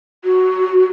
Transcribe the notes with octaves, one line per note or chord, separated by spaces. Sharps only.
F#4